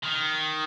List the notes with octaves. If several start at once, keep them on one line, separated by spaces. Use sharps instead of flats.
D#3